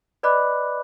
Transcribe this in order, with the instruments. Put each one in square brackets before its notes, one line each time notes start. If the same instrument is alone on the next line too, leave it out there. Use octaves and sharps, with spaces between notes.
[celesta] B4 D5 D#5 B5 D6 F#6